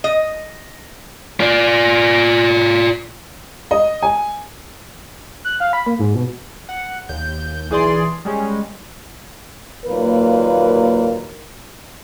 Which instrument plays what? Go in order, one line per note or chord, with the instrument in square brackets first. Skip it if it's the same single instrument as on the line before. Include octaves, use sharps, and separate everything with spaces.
[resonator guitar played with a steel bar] D#5
[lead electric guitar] F4 D5
[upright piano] D#5
G#5
[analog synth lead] F#6
F5
B5
A#3
G#2
B2
[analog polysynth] F#5
D#2 G6
B1 E3 G#4 D5 C6
G3 G#3 C#4
[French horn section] D#2 A#2 F#3 A#3 A#4 B4